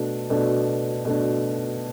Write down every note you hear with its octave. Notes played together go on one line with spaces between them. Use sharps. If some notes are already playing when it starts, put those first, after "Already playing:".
Already playing: B2 A3 D4
B2 A3 D4
B2 A3 D4